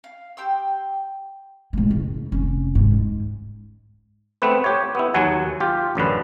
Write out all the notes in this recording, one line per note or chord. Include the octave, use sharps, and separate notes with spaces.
F5
G4 G5 C6 E6
A2 G#3
F#1
F1 C#4
G#2
G#2
A3 B3 C4 B4
G4 C#5
B3 E4
D#2 F#3 F#5 G#5
F4 G4
A1 F#2 D3 B4